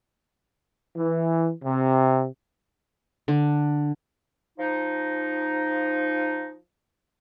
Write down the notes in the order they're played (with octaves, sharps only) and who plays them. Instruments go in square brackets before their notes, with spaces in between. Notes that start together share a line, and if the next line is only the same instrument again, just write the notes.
[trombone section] E3
C3
[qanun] D3
[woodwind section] F3 D#4